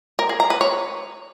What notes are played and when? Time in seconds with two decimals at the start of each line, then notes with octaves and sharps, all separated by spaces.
0.19 A#4
0.29 G#4
0.40 A#5
0.50 B4
0.61 C#5